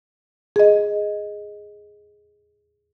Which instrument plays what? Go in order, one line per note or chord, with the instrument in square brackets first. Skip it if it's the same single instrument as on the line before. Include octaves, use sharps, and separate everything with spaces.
[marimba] G#4 D#5